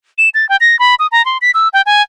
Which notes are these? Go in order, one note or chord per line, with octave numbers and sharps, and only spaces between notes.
E7
A6
G5
A#6
B5
D#6
A#5
C6
B6
E6
G5
G#5